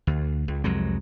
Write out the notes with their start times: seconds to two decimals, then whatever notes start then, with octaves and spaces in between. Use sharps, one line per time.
0.07 D2
0.48 C#2
0.64 C2 F2 F#3 G#3